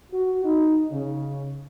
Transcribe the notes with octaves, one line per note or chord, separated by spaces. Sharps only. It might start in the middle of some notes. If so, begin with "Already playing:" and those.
F#4
D#4
C#3